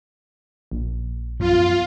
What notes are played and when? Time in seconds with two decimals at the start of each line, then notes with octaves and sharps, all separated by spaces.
0.72 A#1
1.39 F#2 F3 B3 F4